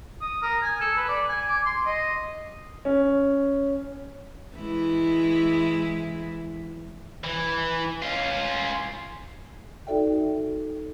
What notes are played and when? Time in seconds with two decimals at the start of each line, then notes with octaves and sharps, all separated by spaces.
0.21 D#6
0.43 A#4
0.63 G#5
0.81 A4
0.97 B4
1.08 D5
1.29 G#5
1.48 D6
1.66 C6
1.86 D#5
2.85 C#4
4.56 E3 G#3 E4
7.24 E3
8.02 C#4 F4
9.87 D#4 F#4 A4 D5 E5 G5